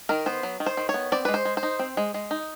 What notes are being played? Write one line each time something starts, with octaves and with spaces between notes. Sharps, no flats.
D#3 A#4
B3 C5
F#3
D#3
C5
D#3
C#5
B3
C4 D5
G#3 B4
C5
G#3
C5
D#4
C4
G#3
G#3
D#4